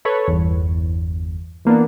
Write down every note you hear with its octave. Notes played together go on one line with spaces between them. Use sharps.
A4 B4 C#5
G1 E2
E3 A#3 B3 D4